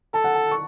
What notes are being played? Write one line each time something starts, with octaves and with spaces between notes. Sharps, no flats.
A4 A5
F#5
A5
C#6